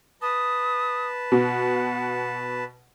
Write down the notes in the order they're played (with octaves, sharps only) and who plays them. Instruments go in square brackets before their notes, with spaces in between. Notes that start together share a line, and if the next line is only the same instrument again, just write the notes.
[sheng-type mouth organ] B4 A5 [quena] D#6
[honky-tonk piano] B2 [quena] F#5